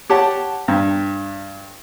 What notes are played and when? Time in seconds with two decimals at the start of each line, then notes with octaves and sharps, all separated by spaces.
0.10 G4 C#5 F#5 A5
0.68 G2